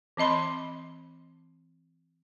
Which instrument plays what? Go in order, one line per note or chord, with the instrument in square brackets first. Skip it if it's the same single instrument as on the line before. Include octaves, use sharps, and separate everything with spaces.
[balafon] E3 C4 D#5 B5 C6